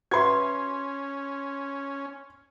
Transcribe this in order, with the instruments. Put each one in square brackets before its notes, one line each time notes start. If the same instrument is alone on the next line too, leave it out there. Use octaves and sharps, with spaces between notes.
[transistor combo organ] C#4 [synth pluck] F#4 B4 E5 [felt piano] C6 G#6